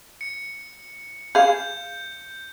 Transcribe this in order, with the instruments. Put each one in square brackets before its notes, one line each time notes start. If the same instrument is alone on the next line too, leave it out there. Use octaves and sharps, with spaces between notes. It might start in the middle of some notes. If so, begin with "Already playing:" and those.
[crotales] C#7
[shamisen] G#4 F5 [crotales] G6